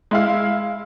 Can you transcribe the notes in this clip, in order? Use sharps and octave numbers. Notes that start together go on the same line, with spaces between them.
G#3 E4 F5